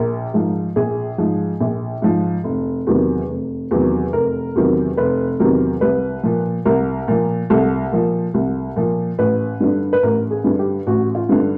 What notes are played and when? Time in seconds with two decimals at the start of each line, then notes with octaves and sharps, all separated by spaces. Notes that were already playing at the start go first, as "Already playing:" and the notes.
Already playing: A#1 A#4
0.34 G#2 F3
0.76 A#1 G#4
1.18 G#2 F3
1.60 A#1
2.02 G#2 F3
2.44 F1
2.87 E2 C3 D#3 F#3
3.29 F1
3.71 E2 C3 D#3 F#3
4.13 F1 A#4
4.55 E2 C3 D#3 F#3
4.97 F1 B4
5.39 E2 C3 D#3 F#3 A#4
5.81 C2 B4
6.23 A#2 F3
6.65 C2 A#4
7.08 A#2 F3
7.50 C2 A4
7.92 A#2 F3
8.34 C2
8.76 A#2 F3
9.18 A1 B4
9.60 G2 D3
9.93 B4
10.03 A1 A#4
10.31 G#4
10.44 G2 D3
10.59 G4
10.87 A1 F#4
11.15 F4
11.29 G2 D3